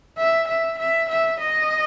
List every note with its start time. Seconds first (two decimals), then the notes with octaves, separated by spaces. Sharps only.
0.17 E5
0.47 E5
0.78 E5
1.09 E5
1.39 D#5